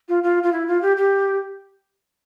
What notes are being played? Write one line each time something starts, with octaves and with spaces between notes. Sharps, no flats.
F4
F4
F4
E4
F4
G4
G4